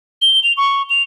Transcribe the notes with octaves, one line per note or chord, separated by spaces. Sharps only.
G7
F7
C#6
F7